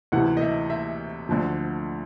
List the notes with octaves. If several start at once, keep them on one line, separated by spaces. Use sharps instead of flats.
D2 C3 E3 F#5
D#5
E5
E5
D2 D3 F3